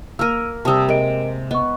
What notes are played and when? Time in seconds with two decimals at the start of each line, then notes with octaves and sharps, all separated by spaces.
0.19 A#3 A#4 E6 F6 D#7
0.65 C3 G3 A5 D#6 E6
0.89 G#3 A#4 D#5 D7
1.51 B3 D#5 C#6